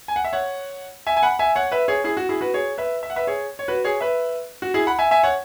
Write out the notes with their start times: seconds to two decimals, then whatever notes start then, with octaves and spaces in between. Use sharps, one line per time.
0.08 G#5
0.16 F#5
0.24 E5
0.33 C#5 F#5
1.07 E5 G#5
1.17 G#5
1.23 F#5 B5
1.39 E5 G#5
1.55 C#5 F#5
1.72 B4 E5
1.88 G#4 C#5
2.04 E4 G#4
2.17 F#4
2.29 E4 G#4
2.41 F#4 B4
2.54 G#4 C#5
2.78 B4 E5
3.03 E5
3.10 F#5
3.16 B4 E5
3.27 G#4 C#5
3.59 C#5
3.68 F#4 B4
3.84 G#4 C#5
4.00 B4 E5
4.62 F#4
4.74 E4 G#4
4.87 F#5 B5
4.99 E5 G#5
5.11 E5 G#5
5.23 C#5 F#5